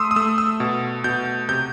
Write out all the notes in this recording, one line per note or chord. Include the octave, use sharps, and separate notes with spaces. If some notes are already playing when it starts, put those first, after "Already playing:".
Already playing: A3 C6 D#6 E6
D#6
A3 E6
E6
B2
B2 G6
C3 G6